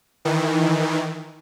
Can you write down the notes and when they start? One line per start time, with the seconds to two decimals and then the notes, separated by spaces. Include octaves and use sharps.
0.25 D#3 E3